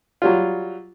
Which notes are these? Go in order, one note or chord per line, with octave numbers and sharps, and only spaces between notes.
F#3 G3 F4